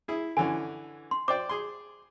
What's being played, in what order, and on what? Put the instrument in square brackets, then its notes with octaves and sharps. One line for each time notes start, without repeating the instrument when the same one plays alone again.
[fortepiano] E4 G#4
[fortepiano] D3 E3 C#4 [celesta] G#5
[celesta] C6
[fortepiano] C5 D5 G5 [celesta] D6
[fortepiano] G#4 C6